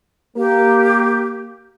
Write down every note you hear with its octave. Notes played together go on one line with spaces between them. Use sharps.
A#3 G4